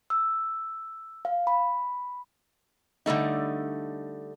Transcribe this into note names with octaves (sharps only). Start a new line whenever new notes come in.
E6
F5
B5
D3 G3 A3 D#4